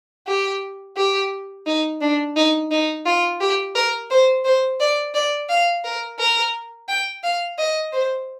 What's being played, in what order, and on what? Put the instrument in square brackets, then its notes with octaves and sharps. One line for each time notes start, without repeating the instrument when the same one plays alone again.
[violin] G4
G4
D#4
D4
D#4
D#4
F4
G4
A#4
C5
C5
D5
D5
F5
A#4
A#4
G5
F5
D#5
C5